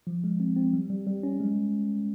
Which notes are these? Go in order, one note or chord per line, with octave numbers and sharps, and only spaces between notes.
F3
G#3
C4
C4
G3
G3
G3
C#4
G#3